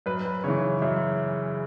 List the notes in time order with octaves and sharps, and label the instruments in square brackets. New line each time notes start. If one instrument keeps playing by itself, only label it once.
[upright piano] F#2 B4
B4
C#3 E3 C#5
F#2 E5